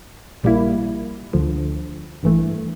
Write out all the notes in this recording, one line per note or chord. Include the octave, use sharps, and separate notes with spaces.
A#1 A#2 G3 A#3 E4
D2 D3 F3
A1 G2 E3 A3